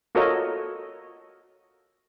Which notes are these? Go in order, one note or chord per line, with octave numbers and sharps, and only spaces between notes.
F4 F#4 A4 A#4 C#5 D#5